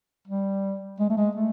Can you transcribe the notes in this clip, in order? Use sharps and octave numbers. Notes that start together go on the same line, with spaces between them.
G3
G#3
A3
G#3
A3